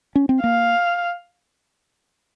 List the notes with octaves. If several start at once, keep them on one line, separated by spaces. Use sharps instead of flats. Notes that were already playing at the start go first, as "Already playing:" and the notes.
C#4
C4
A#3 F5